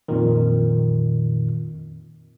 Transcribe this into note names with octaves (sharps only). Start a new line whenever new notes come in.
F2 A#2 D#3